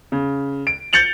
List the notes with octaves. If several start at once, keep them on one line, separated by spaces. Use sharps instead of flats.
C#3
D7
G6 A6 C#7 F7 F#7